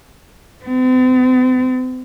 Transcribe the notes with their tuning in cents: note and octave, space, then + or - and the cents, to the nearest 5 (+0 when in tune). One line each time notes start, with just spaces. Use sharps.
C4 -45